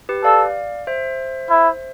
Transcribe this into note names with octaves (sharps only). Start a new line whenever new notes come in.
G4 B4
A4 D5 F5
C5 E5
E4